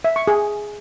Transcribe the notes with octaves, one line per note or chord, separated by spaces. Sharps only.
E5
C#6
G#4